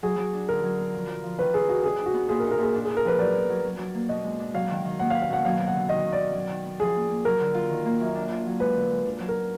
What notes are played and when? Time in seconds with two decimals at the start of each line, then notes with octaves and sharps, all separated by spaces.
0.03 F#3 G#4
0.18 F#3
0.33 D4
0.49 D3 A#4
0.63 F#3
0.79 B3
0.93 F3
1.08 F4
1.24 F3
1.38 D#3 B4
1.53 D#3 G#4
1.68 D#4 F#4
1.83 D4 G#4
1.99 D4
2.06 F#4
2.14 B3
2.29 A#2 G#4
2.40 A#4
2.44 D#4
2.51 A#4
2.58 A#2 G#4
2.74 D4
2.85 G#4
2.89 D4
2.97 A#4
3.04 F3 B4
3.19 F#3 D5
3.34 B3
3.50 F#3
3.64 F#3
3.79 F#3
3.94 A#3
4.09 B2 D#5
4.24 G#3
4.39 D4
4.54 F#3 F5
4.70 D#3
4.85 D#3
5.00 A#3 F#5
5.10 F5
5.15 B4
5.22 F5
5.30 B2 F#5
5.45 F#3 F5
5.59 B3
5.67 F#5
5.74 D3
5.89 D#3 D#5
6.05 D#3
6.13 D5
6.20 D#3
6.34 F#3
6.49 D#3
6.65 B3
6.80 F3 G#4
6.96 A#3
7.10 A#3
7.25 F#3 A#4
7.41 D3
7.55 F4
7.70 D#3
7.86 A#3
8.00 F#2
8.15 D4
8.31 F4
8.46 F#3
8.60 G#3 B4
8.75 D3
8.90 G#3
9.05 D4
9.20 F#3
9.29 A#4